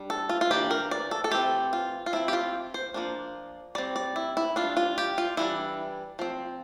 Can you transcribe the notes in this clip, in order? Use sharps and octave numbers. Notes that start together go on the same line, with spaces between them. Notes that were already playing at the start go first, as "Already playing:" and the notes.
Already playing: G3 D4
A4
F4
F4
E3 A#3 D4 G4
A#4
D5
A4
A4
E3 A3 C4 G4
F4
F4
F3 C4 E4
G4
F4
C5
F3 A#3 D4
G3 C4 D5
D5
E4
E4
G3 D4 F4
F4
G4
F4
E3 G3 D4 E4
F3 C4